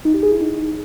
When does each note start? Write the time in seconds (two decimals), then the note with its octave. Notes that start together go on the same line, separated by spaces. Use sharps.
0.05 D#4
0.14 G4
0.23 G#4
0.32 E4
0.41 D#4